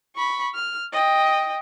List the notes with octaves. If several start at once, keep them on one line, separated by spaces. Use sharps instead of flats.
B5 C#6
F6
D#5 G5